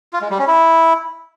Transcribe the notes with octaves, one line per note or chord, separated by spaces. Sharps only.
F4
G#3
G3
C#4
E4